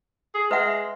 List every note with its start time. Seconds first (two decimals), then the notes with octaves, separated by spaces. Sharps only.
0.35 G#4
0.51 G#3 B4 E5 F#5